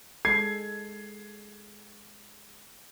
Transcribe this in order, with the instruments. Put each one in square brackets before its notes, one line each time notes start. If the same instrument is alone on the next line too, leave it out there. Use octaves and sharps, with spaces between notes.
[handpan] G#3 A4 [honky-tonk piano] G#6 [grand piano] C7